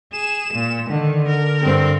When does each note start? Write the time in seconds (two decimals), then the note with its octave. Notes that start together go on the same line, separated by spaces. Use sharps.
0.13 G#4 E7
0.54 A#2
0.90 D3 D#3
1.28 A#4
1.62 G2 C4